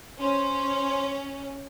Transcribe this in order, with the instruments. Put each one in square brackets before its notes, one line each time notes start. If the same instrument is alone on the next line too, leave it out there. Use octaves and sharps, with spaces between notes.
[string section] C#4 [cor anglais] C5